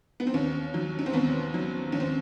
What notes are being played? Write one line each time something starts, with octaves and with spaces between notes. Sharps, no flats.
B3
C4
D#2 C#4
D#3 F#3
C#4
C4
D#2 B3
D#3 F#3
D#2 C#4
C4